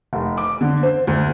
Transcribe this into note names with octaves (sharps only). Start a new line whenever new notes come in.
F1
D6
D3
C5
D2